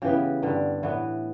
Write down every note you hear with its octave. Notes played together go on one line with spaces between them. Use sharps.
C#3 E3 B3 G4
G2 D3 G3
A2 E3 B3